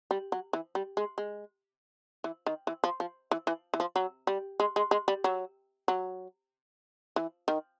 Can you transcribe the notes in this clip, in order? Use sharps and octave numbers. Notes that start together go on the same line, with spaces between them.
G3
F#3
E3
G3
G#3
G#3
E3
D#3
E3
F3
F3
E3
E3
E3
F3
F#3
G3
G#3
G#3
G#3
G3
F#3
F#3
E3
D#3